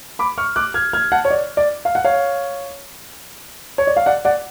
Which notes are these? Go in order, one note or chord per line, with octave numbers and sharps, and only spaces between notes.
B5 D6
C#6 F6
D6 F#6
F6 G#6
F6 G#6
F#5 A5
C#5
D5
D5
F5
F#5
C#5 F5
C#5
D5
F5
D5 F#5
D5 F#5